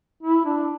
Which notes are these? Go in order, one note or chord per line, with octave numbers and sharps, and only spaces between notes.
E4
D4